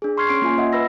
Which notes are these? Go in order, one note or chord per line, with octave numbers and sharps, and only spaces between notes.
D4 G#4
C6 C#6 F6 G#6 C7
C#4 C6 D7
A#3 F4 G#5
D#5 E5 F#5
B4 B5 E6 A#6